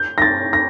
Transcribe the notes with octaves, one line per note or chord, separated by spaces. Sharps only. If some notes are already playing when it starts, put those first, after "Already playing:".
Already playing: G6
A#6
A6
A#6